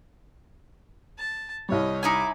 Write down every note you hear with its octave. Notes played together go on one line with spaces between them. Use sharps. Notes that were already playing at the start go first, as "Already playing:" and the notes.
A5
C2 G3 C#5 D#5
D#4 E4 G#5 D6